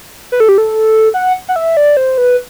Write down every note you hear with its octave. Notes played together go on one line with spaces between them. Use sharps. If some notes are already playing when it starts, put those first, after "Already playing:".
B4
A4
G4
A4
F#5
F#5
E5
D5
C5
B4